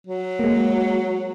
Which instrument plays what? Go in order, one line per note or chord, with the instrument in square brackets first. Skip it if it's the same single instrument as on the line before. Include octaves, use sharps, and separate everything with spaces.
[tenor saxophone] F#3
[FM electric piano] G#3 A#3